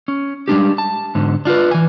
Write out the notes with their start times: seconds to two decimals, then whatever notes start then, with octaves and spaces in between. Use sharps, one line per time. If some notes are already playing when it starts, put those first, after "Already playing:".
0.08 C#4
0.48 G3 G#3 D4 G4
0.78 A5
1.15 G#2 D3
1.45 D4 F4 F#4 B4
1.71 E3 G#5